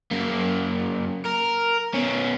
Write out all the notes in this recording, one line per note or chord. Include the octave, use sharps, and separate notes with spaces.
F#2 A#3
A#4
B2 C#4